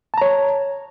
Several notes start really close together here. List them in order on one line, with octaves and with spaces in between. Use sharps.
A5 A#5 C#5